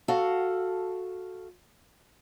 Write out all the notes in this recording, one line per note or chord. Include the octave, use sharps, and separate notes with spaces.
F#4 A4 F5